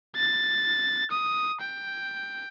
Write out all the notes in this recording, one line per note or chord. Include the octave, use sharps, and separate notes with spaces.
A6
D#6
G5